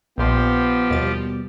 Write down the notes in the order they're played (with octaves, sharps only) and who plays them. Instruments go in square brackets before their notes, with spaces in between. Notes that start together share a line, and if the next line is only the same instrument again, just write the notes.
[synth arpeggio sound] A#1 C6 [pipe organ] F3 G4 [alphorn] B3
[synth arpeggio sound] D#2 A6 [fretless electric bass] B2 G3